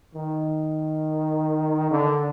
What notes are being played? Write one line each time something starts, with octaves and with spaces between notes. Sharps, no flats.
D#3
D3